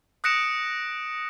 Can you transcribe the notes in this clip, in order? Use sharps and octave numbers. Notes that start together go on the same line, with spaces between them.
D#6 F#6 A#6 C#7 D7 E7